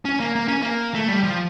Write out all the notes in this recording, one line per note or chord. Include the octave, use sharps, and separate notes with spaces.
C#4
A#3
A#3
C#4
A#3
A3
G3
F3